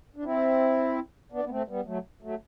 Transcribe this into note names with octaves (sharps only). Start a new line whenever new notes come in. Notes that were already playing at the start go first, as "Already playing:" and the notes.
D4
C4 E4
B3 D4
B3
A3 C4
G3 B3
F#3 A3
F#3 A3